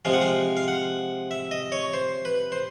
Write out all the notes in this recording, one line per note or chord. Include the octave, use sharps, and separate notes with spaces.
C3 F3 G#3 F5
F#5
F5
F5
F#5
E5
D#5
C#5
C5
B4
C5